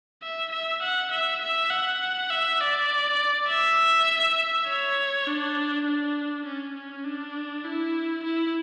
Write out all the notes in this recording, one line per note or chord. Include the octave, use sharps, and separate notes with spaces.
E5
E5
F#5
E5
E5
F#5
E5
D5
E5
C#5
D4
D4
C#4
C#4
D4
E4
E4